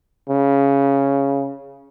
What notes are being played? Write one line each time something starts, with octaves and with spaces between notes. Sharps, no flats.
C#3